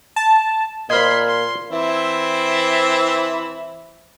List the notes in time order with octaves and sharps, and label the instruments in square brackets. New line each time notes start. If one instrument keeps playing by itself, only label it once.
[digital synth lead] A5
[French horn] A#2 [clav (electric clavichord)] C5 D#5 [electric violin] B5 C6 [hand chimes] F6 G#6
[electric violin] C6
[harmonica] E3 C4 E4